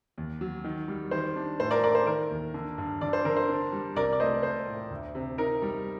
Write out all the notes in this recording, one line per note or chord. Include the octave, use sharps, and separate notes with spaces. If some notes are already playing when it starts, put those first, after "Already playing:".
D#2
F#3
D#3
G3
D#3 C5
D4
A2 C5
A#4 D5
A4 A#4 D5
C5
D#3 A#4
D#2
D3
G2
D3 D5
C5
D3 A#4
C5
D4
G3
C2 A#4 D5
D5
A3 C5 D#5
A4 C5
A2
D2
C3
D#4 A#4
G3